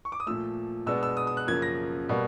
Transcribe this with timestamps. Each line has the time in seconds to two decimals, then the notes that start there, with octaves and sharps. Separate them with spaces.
0.05 C#6
0.12 D6
0.20 D#6
0.26 A#2 F3 A3 E6
0.86 B2 G#3 B3 D4 E6
1.03 E6
1.17 D#6
1.27 D#6
1.37 F#6
1.47 F#2 C#3 F3 A#3 G#6
1.62 A#6
2.09 B2 G3 A#3